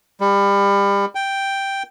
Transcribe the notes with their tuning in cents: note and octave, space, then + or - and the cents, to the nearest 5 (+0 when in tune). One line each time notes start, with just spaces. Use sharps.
G3 +30
G5 +0